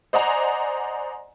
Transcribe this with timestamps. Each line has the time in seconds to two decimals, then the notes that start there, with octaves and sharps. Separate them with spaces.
0.13 C5 D5 D#5 F#5 G#5 A#5